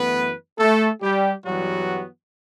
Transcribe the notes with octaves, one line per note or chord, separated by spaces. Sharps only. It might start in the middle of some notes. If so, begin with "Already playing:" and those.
Already playing: F#2 E3 A3 B3 B4
A3 A4
G3 G4
G2 E3 F#3 G3 B3 F#4